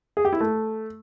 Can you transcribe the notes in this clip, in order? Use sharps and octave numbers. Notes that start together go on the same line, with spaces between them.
G#4
G4
E4
A3